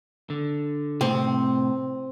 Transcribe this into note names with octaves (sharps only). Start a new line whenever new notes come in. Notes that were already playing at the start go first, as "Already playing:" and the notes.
D3
A2 C3 C4